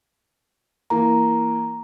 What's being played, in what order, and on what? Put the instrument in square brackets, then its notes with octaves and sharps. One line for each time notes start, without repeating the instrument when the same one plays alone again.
[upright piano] E3 A#3 [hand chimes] A#5